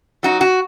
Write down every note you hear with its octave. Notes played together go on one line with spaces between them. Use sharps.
F#3 D#4 F#4
F#4